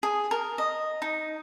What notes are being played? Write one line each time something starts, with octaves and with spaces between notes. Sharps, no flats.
G#4
A#4
D#5
D#4